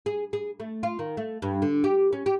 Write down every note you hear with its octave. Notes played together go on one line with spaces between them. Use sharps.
G#4
G#4
A3
F4
D#3
A3
G2
D3
G4
C#4
G4